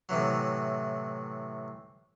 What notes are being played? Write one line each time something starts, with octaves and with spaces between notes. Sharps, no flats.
A2 C3 E3 F#3